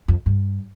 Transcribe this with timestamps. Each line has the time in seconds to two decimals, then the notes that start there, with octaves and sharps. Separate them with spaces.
0.08 F2
0.26 G2